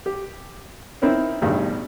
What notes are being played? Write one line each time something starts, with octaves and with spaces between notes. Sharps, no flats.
G4
C4 D#4 E4 A#4 C#5
A1 E2 G2 B2 D#3